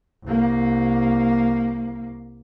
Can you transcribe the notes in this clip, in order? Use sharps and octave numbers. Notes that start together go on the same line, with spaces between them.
C2 A#3